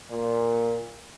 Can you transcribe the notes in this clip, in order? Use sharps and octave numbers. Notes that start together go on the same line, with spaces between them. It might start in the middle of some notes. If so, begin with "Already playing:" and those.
A#2